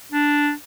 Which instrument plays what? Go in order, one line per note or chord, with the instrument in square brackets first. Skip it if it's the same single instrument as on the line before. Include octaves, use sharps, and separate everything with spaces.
[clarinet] D4